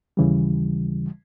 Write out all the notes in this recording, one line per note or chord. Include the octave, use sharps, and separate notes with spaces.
D#2 C#3 E3 G3